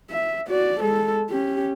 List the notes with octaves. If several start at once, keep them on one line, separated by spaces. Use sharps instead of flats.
E5
F#4 D5
G#3 A4
C#4 G4